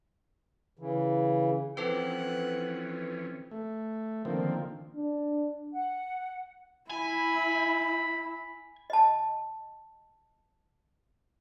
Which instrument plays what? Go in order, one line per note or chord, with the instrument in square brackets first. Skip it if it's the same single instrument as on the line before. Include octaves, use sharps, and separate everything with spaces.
[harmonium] C#3 E3
[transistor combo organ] E3 F3 C#4 [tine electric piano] C4 [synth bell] E4 A4 B4 [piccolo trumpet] F#5
[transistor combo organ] A3
D3 D#3 F3 A#3 C4
[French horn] D4
[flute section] F#5
[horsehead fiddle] E4 [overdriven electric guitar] G#5 [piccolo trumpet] B5
[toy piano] D#5 A5